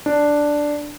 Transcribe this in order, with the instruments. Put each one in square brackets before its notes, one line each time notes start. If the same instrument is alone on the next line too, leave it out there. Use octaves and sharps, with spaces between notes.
[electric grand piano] D4